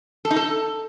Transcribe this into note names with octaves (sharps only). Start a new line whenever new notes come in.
A4
D#4
A4